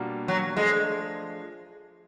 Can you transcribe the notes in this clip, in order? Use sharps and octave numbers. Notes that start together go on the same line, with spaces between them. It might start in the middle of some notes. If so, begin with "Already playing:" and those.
Already playing: B2 G3 A#3 D4 F4
F#3
F3 G#3 A3 D4